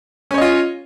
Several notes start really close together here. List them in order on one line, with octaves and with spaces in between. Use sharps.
C#4 C#5 D#5 F4